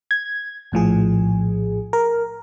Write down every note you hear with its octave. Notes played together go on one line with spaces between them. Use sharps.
G#6
A#1 A2 F3 G#4
A#4